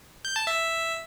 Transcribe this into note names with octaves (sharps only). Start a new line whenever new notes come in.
G6
A5
E5